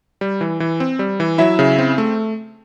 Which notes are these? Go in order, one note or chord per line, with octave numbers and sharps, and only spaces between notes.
G3
E3
E3
C4
G3
E3
F#3 E4 E5
C#3
C4
A3